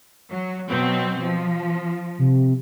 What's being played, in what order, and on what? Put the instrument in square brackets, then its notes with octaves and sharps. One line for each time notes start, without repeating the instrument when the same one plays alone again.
[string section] F#3
B2 F#3 C4
F3
[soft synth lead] C3